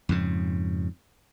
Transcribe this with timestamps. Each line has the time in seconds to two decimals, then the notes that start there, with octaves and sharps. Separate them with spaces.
0.09 F2 G#2 C#3